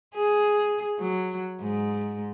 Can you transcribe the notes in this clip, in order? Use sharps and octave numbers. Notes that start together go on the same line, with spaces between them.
G#4
F#3
G#2